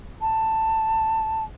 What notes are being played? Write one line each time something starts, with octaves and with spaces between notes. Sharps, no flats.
A5